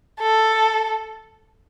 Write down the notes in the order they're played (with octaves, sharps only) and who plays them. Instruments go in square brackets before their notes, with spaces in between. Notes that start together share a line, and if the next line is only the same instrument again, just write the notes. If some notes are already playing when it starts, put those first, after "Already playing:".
[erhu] A4